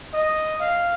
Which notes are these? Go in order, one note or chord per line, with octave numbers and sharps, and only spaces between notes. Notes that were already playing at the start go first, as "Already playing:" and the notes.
D#5
F5